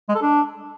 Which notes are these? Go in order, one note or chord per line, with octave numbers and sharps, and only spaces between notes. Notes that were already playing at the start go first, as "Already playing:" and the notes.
G#3
A4
D4